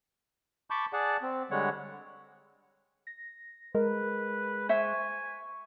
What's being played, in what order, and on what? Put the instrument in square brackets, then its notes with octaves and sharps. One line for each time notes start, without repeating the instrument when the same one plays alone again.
[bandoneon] A5 B5 C#6 D6 G6
G#4 D5 F#5 A5
C4
D3 G3 G#3 C#5 F#5
[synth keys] A#6
[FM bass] G#3 [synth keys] A#4 [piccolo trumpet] B4
[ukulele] C5 E5 [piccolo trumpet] G#5 [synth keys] C#6